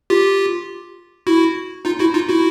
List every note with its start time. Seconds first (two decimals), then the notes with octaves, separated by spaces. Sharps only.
0.10 F4 G4
1.27 E4 F#4
1.85 D#4 F4
1.99 E4 F#4
2.14 D#4 F4
2.29 E4 F#4